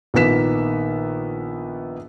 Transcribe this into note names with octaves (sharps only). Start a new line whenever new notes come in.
A#1 D#3 A#3 B3 B6 E7